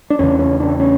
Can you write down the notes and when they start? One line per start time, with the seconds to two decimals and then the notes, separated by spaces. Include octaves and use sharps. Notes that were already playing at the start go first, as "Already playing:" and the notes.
0.10 D4
0.19 E2 C#3 C#4
0.39 C#4
0.60 D4
0.80 C#4